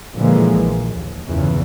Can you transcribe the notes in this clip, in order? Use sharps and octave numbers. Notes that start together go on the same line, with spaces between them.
A#2 D3 E3 F3 G#3 A#3
A#1
D#2
G1 E2 A#2 C#3 E3